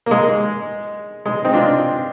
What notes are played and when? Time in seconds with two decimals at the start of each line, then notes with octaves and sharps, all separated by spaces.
0.06 A#3
0.11 G#3
1.26 G#3
1.45 C4 D#4
1.54 D4 F4